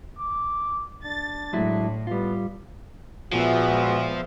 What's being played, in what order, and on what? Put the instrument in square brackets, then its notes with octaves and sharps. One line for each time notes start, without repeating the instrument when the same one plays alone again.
[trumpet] D6
[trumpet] D4 [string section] A6
[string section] A2 [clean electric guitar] F#3 G#3 E4
[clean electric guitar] G3 F4 [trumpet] B3
[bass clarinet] A#2 [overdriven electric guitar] F3 [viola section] G#3 B3 E5 [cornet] F#4